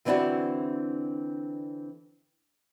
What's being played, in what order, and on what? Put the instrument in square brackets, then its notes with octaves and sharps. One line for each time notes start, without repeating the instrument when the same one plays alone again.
[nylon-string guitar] D3 E3 C4 D4 E4 F#4